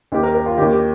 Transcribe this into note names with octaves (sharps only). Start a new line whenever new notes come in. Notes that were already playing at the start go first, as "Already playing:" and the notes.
D#2 D#3 G4
A#4
A#4
F4
D#2 D#3 G4
G4